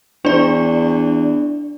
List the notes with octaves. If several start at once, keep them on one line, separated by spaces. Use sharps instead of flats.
E2 D4 D5